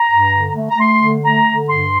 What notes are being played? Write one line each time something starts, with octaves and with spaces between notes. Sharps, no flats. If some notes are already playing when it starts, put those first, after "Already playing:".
Already playing: A#5
G2
D3
A3
A#5
A3 C6
D3
A3 A#5
D3
G2 C6